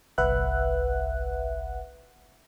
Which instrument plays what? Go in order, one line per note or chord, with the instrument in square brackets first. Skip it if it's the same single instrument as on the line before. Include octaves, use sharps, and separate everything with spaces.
[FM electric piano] G1 C2 B4 E5 F#5 F#6